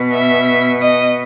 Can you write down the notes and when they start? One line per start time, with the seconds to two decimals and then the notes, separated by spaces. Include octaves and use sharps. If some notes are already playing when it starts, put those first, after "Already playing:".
Already playing: B2
0.12 E5
0.80 D#5